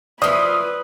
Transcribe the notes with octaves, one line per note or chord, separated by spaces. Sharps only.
E3 F3 B4 D5 D#6